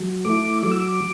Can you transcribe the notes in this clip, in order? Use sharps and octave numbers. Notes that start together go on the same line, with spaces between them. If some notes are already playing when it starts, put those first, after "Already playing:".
Already playing: F#3
A3 E4 D6
F#3 D6
E6
D6